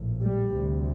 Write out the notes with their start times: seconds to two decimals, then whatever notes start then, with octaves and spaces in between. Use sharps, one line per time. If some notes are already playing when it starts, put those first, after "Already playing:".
Already playing: A#1 A2
0.20 G3
0.53 D2 C3